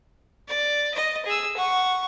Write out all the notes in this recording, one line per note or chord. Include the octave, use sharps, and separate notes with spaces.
D5
D#5
G#4 E6
F#5 C#6